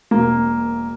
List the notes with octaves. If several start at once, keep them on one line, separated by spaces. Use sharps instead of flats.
E1 A#3